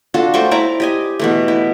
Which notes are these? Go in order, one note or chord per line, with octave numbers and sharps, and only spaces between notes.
D4 F4 F#4 A4
A3 C5 G5 C#6
E4 D5 A#5
G4 D#5 G#5
B2 E3 A3
E4